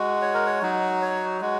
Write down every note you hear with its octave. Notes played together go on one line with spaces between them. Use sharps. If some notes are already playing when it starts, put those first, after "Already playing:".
Already playing: G#3 F#4
C#5
A#4
C#5
F#3 D#4 F#4
C#5
G#3 F#4